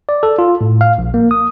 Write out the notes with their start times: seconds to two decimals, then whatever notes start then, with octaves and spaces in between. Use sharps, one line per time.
0.09 D5
0.23 A4
0.39 F4
0.61 A2
0.81 F5
0.98 A#1
1.14 A#3
1.31 D#6